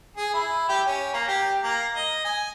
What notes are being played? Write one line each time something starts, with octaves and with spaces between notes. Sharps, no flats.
G#4
E4
G4
C#4
A#3
G4
A#3
D#5
G#5